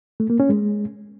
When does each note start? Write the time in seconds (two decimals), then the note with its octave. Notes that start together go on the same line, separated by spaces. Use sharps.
0.20 A3
0.30 A#3
0.40 C#4
0.49 G#3